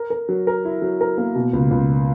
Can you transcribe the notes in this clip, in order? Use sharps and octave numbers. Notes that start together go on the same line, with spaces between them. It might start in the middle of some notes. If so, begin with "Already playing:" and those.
Already playing: A#4
A#4
F#3
A#4
E4
F#3
A#4
A#3
B2
C#2
C#2